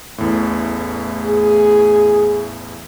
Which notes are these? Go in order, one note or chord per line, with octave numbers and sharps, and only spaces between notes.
A1 E2 A2
G#4